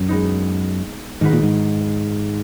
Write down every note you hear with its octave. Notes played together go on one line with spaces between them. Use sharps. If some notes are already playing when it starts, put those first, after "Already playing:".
Already playing: F#2
G#3 B3 D#4
G#2 D#3 G#3 D#4 F#4 B4
A#2
G#2